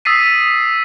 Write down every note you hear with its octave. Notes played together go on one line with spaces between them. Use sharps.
D#6 E6 A6 B6 C7 D#7